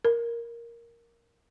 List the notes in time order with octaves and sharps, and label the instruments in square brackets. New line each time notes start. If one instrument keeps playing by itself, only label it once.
[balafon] A#4